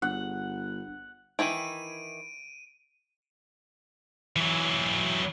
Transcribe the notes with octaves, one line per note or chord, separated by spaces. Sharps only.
G1 F#5
D#3 E3 E4 D7 D#7
E3 F#3